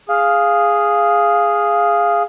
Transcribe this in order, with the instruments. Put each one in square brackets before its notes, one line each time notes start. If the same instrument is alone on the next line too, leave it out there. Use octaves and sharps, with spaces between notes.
[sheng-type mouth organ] G#4 [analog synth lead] F5